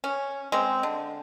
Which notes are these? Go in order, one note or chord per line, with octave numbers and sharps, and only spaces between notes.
C#4
G#3 C4
D3